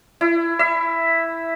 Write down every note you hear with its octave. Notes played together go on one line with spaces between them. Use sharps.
E4
E5